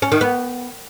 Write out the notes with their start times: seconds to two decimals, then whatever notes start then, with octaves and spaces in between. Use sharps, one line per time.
0.02 C#4
0.12 D#3
0.21 B3